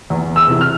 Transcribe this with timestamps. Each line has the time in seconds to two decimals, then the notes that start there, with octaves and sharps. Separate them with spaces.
0.10 E2
0.36 E6
0.48 C3 E3
0.61 F6